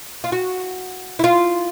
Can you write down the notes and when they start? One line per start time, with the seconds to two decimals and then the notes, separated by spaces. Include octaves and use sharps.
0.24 F4
0.32 F#4
1.19 E4
1.24 F4